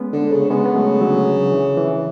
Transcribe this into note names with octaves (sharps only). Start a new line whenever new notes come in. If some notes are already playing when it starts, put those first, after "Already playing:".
Already playing: G#3 B3 C#4
D3
C#3
C#3 G#3 B3
B3
F#3 A3
D3 F#3
D3
E3
E3